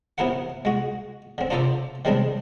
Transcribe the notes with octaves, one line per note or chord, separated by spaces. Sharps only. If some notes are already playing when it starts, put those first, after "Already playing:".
C3 B3 E4 A#4 B4 F#5
G#3 F#4
D3 C4
D4 F4 A#4 C5 D5 E5
D#3 G3 G#3 C4 D4